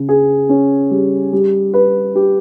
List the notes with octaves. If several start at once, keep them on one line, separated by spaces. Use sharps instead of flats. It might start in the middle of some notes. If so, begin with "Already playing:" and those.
Already playing: C#3
G#4
C#4
G3
G3
B4
G4